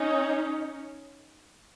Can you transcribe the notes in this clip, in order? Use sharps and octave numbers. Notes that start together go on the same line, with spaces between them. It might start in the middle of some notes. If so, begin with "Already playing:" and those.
Already playing: C#4 D#4